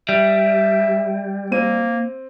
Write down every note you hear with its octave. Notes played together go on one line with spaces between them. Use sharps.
G3 E5
A#3 C4 D#7